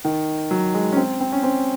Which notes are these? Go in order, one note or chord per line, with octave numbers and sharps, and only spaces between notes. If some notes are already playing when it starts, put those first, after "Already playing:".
D#3
F#3
G#3
C#4
C4
C4
C#4
C4